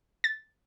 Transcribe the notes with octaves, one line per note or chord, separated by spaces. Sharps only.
A6